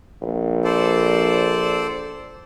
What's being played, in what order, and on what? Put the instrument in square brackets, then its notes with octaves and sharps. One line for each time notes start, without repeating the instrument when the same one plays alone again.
[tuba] A#1
[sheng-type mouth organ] A4 C5 D5